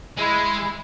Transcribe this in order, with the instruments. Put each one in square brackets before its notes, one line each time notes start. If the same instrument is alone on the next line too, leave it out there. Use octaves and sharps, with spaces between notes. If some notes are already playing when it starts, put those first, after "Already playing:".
[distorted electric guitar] G#3 [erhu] E4